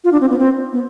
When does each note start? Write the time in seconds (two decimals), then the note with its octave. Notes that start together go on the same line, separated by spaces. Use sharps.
0.04 F4
0.12 D4
0.21 C4
0.30 B3
0.39 C4
0.73 B3